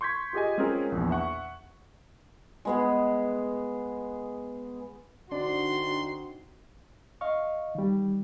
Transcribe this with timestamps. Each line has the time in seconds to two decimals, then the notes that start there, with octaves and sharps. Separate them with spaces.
0.01 C6 C#6 G6 G#6 B6
0.33 F4 G4 G#4 D#5 G#5
0.58 G#3 C4 C#4 F4 G#4 A#4
0.92 A#1 E2
1.10 E5 F#5 C#6
2.65 G#3 B3 G#4
5.31 D3 C4 D4 D#4 F#4 D5 C6
7.21 D#5 F5 C#6
7.75 D#3 G3